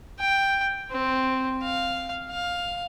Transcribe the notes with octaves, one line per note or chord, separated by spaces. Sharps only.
G5
C4
F5
F5